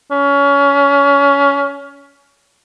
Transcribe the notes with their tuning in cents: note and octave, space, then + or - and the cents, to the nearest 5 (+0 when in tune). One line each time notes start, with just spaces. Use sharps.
C#4 +25